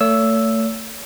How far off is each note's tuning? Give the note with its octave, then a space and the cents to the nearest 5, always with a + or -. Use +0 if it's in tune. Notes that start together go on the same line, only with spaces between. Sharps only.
A3 +30 C#5 +40 E6 +0